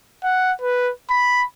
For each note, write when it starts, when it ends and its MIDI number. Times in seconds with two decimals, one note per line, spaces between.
0.24 0.52 78
0.62 0.91 71
1.10 1.44 83